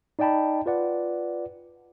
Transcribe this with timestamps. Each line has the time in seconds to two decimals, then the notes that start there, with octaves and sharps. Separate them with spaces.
0.19 D#4 D5 D#5 G5 A5 B5
0.66 F4 B4 D5 F#5